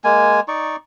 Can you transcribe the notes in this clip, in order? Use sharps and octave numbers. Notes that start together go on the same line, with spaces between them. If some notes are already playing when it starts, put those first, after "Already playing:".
G#3 A#3 G#5
D#4 D5 C#6